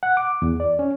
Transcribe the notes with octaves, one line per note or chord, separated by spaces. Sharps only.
F#5
D6
E2
D5
C#4